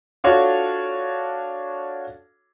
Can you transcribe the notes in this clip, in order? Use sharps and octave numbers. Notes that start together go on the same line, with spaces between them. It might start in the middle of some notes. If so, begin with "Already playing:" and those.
D4 F4 F#4 A4 C#5